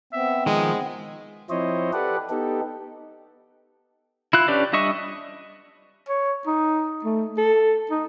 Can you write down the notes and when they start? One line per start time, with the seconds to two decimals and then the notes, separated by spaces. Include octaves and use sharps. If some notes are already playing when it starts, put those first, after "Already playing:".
0.13 B3 C4 E5
0.46 D#3 F3 G#3 D#6
1.50 F3 C4 E4 C5 C#5 D#5
1.93 G4 A4 B4 D5 F#5
2.30 B3 D#4 G4 A4
4.33 E4 F4 F#6
4.48 C#4 D4 G4 B4 D5
4.73 G3 D4 D#5 E5 C#6
6.09 C#5
6.47 D#4
7.05 A3
7.38 A4
7.90 D#4